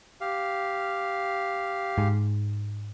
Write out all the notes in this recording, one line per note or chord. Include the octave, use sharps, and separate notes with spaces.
G4 F5
G#2